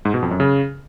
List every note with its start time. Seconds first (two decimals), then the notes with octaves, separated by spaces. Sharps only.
0.05 G#2
0.14 B2
0.22 F2
0.31 F#2
0.40 C#3